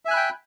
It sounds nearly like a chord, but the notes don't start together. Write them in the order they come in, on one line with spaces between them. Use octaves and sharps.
E5 G#5 F#6 B5 G5